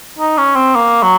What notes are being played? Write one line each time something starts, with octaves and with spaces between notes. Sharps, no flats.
D#4
C#4
C4
A#3
F#3